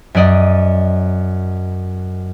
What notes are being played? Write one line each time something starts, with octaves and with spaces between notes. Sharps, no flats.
F#2 F#3 D5 D#5